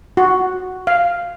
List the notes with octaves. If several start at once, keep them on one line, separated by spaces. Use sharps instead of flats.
F#4
F5